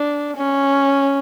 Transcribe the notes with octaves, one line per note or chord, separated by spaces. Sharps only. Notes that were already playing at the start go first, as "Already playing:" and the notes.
Already playing: D4
C#4